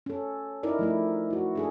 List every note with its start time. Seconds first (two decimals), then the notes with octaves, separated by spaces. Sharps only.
0.06 C#4 A4
0.63 C#4 D#4 E4 A#4 D5
0.79 F3 A3 E4
1.30 E4 F#4
1.55 D4 G#4 A4